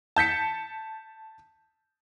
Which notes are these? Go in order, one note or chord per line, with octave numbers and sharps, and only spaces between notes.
A5 G6 B6 C#7